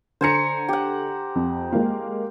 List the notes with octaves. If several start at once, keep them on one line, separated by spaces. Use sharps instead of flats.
D3 C5 G#5 A#5 C#7
G4 F#5
F2
G#3 A#3